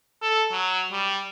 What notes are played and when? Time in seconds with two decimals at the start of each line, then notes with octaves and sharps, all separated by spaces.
0.22 A4
0.52 F#3
0.92 G3